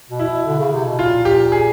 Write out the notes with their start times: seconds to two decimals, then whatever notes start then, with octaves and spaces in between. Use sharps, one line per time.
0.10 B2
0.19 E4
0.28 B2
0.46 D3
0.59 C#3
0.73 C3
0.85 B2
0.99 A#2 F4
1.25 G4
1.52 G#4